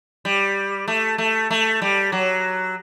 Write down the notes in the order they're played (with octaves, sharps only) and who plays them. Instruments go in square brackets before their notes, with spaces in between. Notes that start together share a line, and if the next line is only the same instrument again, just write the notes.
[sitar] G3
A3
A3
A3
G3
F#3